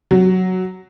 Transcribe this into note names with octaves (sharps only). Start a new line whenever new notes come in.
F#3